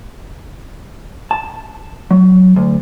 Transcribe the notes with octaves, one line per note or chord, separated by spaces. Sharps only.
A5
F#3
D2